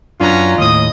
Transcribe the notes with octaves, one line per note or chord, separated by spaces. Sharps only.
F#2 B3 C#4 D4 F4 A#5
D#2 A2 D#5 D#6